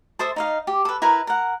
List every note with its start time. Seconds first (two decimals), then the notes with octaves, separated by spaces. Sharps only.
0.19 A4 C5 E5 D#6
0.36 D#4 D#5 F5
0.67 G4
0.85 A4 B4
1.02 E4 A#4 B4 A#5
1.27 A#4 F#5